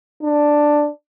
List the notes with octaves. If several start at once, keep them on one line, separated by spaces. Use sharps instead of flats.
D4